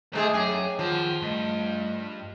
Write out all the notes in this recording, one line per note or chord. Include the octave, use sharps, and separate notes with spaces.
C3 G#3 A3 D#4 G#4 A4 E5 D#6
F#2 G#4 C#5 G5 D6
D#2 F3 F4 F#5
G2 A3 D#5